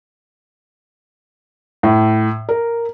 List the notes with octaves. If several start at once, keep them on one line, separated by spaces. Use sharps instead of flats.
A2
A#4